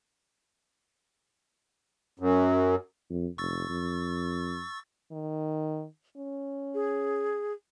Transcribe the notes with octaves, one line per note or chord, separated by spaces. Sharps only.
F#2
F2
F1 C#6 E6 A6
F2
D#3
C#4
G#4